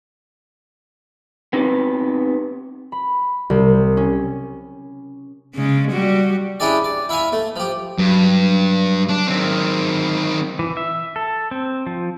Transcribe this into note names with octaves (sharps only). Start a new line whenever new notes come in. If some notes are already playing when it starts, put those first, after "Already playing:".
B3 C4 D#4 G4 B4
B5
C2
C#4
C#3 G#3
G3 F#4
C#4 D4 E4 G4 G#4 D5
D5
E4 E5 F5 G#5
A3
F3 G4
G2 F#3
D4
D#3 C4
E3
E5
A4
C4
F3